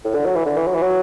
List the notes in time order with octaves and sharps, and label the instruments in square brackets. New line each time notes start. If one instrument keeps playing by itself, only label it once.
[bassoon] A2
D3
F#3
E3
D3
E3
F#3
E3
F#3